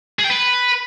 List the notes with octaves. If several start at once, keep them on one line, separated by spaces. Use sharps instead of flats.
G#4
G5
B4